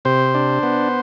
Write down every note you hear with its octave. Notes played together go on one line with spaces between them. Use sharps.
C3 C5
D4
B3